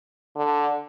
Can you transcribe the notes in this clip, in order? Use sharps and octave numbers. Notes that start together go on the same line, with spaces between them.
D3